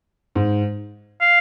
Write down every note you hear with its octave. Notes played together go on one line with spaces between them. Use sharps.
G#2
F5